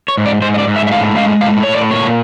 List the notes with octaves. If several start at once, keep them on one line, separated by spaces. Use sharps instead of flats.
C#5
G#2
D5
G#2 C5
D#5
D5
G#2
E5
E5
A2 F5
G#3 F5
A2 F5
A2 C#5
D5
A#2 C#5